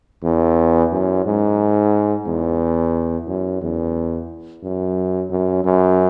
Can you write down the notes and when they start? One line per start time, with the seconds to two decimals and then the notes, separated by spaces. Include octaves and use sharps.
0.24 E2
0.92 F#2
1.26 G#2
2.26 E2
3.28 F#2
3.62 E2
4.63 F#2
5.30 F#2
5.65 F#2